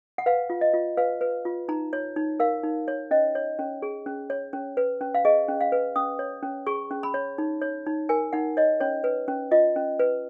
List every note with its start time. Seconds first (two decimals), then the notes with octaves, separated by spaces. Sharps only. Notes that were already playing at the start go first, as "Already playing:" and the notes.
0.18 F#5
0.26 B4 F5
0.50 F4
0.61 D#5
0.74 F4
0.97 B4 F5
1.21 B4
1.45 F4
1.69 D#4 A#5
1.93 C#5
2.16 D#4
2.40 A#4 F5
2.63 D#4
2.88 C#5
3.11 C#4 D#5
3.35 C#5
3.59 C#4
3.82 G#4
4.06 C#4
4.30 C#5
4.53 C#4
4.77 B4
5.01 C#4
5.14 F5
5.25 G#4 D#5
5.48 C#4
5.61 F5
5.72 B4
5.96 C#4 D#6
6.19 C#5
6.43 C#4
6.67 G#4 C#6
6.91 C#4
7.03 B5
7.14 C#5
7.38 D#4
7.62 C#5
7.86 D#4
8.09 A#4 G#5
8.33 D#4 F#5
8.57 C#5 D#5
8.80 C#4 C#5
9.04 B4
9.28 C#4
9.51 F4 D#5
9.76 C#4
9.99 B4